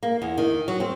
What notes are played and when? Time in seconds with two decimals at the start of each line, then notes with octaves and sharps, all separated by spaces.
0.03 A#3
0.22 E2
0.38 D#3
0.68 F#3
0.80 C4